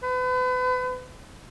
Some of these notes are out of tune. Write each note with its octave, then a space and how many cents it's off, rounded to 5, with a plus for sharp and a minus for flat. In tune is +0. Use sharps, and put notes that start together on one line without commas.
B4 +35